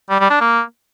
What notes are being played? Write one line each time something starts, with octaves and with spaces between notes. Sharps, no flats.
G3
G3
D4
A#3